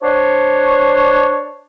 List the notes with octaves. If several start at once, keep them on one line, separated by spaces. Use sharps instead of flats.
D4 C5 C#5